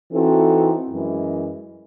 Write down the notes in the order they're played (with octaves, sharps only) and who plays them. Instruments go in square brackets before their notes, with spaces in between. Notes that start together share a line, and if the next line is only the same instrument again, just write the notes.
[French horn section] E3 C4 D#4 F#4 A4
F#2 E3 G#3